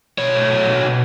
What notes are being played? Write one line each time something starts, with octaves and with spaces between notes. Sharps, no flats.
B2 C#5
A3
F#3
B2
B2